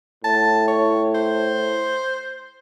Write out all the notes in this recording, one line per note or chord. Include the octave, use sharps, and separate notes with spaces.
A2 A5
C#5
C5